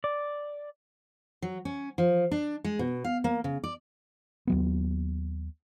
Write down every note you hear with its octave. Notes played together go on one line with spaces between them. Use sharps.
D5
F#3
C#4
F3
D4
G#3
B2
F5
A#3
C#3
D5
D#2 F#3 B3